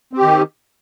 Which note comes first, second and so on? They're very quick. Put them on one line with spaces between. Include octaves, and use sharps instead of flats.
C4 G4 D#3